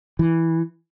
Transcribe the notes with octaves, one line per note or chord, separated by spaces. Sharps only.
E3